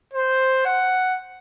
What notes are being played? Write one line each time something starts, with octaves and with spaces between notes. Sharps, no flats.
C5
F#5